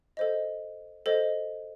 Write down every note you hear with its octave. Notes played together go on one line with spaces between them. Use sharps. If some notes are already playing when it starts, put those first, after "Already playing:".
A4 C5 D#5
A4 C5 D#5